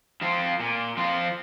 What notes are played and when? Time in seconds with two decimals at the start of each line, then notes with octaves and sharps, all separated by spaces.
0.21 F3 C4 F4
0.60 A#2
0.97 F3 C4 F4